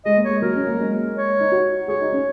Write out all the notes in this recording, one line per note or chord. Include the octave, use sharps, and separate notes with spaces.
G#3 D#5
A#3
G#3 C#5
F#3 A#4
C#4
A#3
G#3
C#5
D#4
F#4
G#4 C#5
D#4
C#4